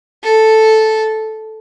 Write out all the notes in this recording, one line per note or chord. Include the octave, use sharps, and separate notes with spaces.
A4